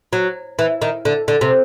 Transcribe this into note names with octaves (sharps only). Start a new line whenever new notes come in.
F#3
E3
D#3
D3
D3
C3